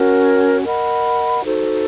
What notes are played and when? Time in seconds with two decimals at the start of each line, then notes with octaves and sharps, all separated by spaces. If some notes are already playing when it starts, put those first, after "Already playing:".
Already playing: C#4 F#4 A#4 C#5
0.63 A#4 D#5 F#5 B5
1.43 D#4 F#4 A4 C5